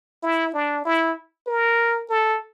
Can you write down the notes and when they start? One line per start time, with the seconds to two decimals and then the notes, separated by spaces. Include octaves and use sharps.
0.23 E4
0.53 D4
0.85 E4
1.47 A#4
2.09 A4